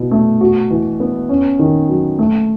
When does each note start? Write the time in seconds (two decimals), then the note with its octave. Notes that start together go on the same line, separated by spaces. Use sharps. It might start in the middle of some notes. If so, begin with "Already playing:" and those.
Already playing: B2 E4
0.11 A3
0.41 F#4
0.70 E3
1.00 B3
1.29 C#4
1.59 D#3
1.88 F#3
2.19 A3